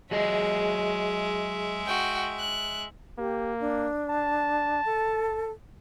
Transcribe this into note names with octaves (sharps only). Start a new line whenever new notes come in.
F#3 G#3 G#4 D#5 E5
F#4 G5
F#6
A#3 G4
D4
A5
A4